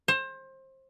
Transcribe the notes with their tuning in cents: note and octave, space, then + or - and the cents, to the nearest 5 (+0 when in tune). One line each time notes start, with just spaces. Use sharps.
C5 +25